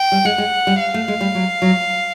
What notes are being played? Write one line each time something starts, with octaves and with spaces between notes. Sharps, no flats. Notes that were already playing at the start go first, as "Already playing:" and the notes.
Already playing: G5
G3
G#3 F#5
G#3
G3
F5
A3
G#3
G3
F#3
F#3